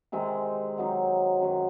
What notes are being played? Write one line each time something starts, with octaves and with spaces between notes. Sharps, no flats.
C3 D#3 G#3 C4
D#3 F#3 C4 D#4
F#2 D#3 F#3